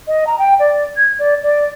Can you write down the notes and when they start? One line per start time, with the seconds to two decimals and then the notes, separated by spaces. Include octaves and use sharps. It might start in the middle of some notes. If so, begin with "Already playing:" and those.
0.07 D#5
0.26 A#5
0.38 G5
0.59 D5
0.96 G#6
1.19 D5
1.43 D5